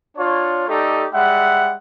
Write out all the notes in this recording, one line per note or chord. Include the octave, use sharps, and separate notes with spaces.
D4 F4 C#5
A3 D#4 G4 A4 D5
G3 G#3 E5 F#5